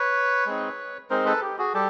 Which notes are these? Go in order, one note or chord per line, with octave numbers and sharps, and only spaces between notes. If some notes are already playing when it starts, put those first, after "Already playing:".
Already playing: B4 C#5
G#3 C4 D#4
G#3 C4 D#4 A#4 C5
A4 B4
G4
F#4 G#4
G3 G4 A4